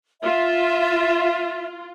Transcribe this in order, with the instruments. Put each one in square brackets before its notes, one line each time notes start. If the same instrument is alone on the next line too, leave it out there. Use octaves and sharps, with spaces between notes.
[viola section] F4 [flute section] E5